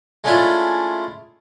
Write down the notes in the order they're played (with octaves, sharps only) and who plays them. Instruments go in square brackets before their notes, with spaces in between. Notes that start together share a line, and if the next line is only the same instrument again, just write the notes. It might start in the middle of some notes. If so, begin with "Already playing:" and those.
[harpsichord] G#3 A3 C#4 D4 E4 F4